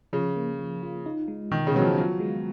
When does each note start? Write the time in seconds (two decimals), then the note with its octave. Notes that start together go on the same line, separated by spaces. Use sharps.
0.13 C#3 F3
0.36 A#3
0.59 F3
0.83 F4
1.06 D#4
1.28 G#3
1.51 B2 D#3
1.67 C#3
1.74 F#3 B3
1.82 F3
1.97 F#3 F4
2.20 G#3